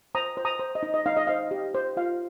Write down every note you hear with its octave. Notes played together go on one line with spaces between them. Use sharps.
C5 A#5 D#6
C5
A#5 D#6
C5
D#5
D#4
D#5
D#4 F5
D#5
C5 F5
G4
C5
F4 F5